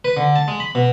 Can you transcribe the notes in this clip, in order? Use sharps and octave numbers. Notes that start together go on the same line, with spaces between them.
B4
D3
A5
G#3
B5
B2